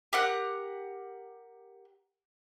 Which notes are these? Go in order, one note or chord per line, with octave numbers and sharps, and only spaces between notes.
G4 A#4 F#5 F#6